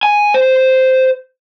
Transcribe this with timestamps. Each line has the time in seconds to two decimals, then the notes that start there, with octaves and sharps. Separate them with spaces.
0.03 G#5
0.34 C5